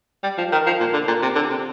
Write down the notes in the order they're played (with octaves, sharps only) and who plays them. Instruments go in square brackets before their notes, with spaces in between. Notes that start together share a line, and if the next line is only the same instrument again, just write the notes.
[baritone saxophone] G3
F3
D#3
F3
A#2
D3
A#2
C3
D3
C3